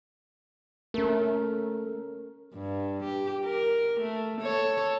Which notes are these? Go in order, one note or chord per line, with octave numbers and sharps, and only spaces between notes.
A3 C#4 A#4
G2
G4
A#4
A3
A4 C#5